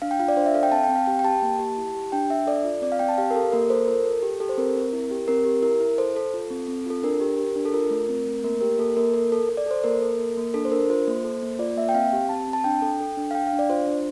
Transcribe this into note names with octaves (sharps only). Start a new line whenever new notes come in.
D4 F5
G5
F4 F5
D5
D4 C5
E5
A4 F5
G5
C4 A5
G5
C4
F5
G4 G5
G5
G4 A5
A#3
G4
E4
G4
D4 G5
D4 E5
A4 D5
F4
C4 D5
F5
C4 G5
A5
G4 F5
A#4
G4 A4
A#3 A#4
A4 C5
F4 A#4
A4
G4
G4 A4
C5
C4 A#4
C4
E4
G4
C4 A#4
G4
E4 A#4
E4
A4 C5
A4
F4
C4
C4
F4 A4
D4 A#4
G4
G4
D4
A4
F4 A#4
A3
C4
A3
A#3 A#4
G4 A#4
A#3 A4
A#3 A#4
A4 A#4
A4
A4
D5
A4 C5
A#3 A#4
A4
A#3
A#3
D4 A4
C5
D4 A#4
F4 C5
A#3
A4
A#3
F4 D5
A#3 E5
G5
C4 F5
G4
C4 A5
C4
A5
D4 G5
A4
A4
D4
F5
D4 G5
F5
D4
D5
F4 C5
D4